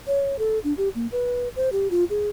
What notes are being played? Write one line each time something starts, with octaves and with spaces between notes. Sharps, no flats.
C#5
A4
D4
G4
A#3
B4
C5
G4
F4
G#4